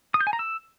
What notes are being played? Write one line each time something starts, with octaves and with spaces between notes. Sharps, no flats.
D#6
G6
G#5
A#5
E6